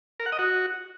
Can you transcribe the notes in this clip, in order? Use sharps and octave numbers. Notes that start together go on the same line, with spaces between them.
A#4
F#5
D#5
F#4